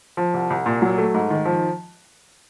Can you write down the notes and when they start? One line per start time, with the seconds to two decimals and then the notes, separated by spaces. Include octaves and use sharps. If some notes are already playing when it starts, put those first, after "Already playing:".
0.17 F3
0.34 C2
0.50 C2
0.66 A#2
0.82 F#3
0.98 A3
1.14 G#2
1.30 D#3
1.46 F3